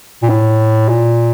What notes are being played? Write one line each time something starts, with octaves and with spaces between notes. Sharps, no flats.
A#2
A2
A#2